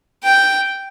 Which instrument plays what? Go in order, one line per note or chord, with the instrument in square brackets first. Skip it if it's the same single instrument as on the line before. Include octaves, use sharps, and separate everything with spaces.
[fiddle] G5